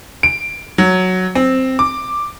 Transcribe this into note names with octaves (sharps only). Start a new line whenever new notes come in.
D7
F#3
C4
D6